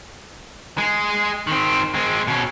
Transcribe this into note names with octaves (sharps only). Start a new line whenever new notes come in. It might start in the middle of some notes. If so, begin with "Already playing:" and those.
G#3 G#4
D#3 C4
G#3 C4
B2 C#4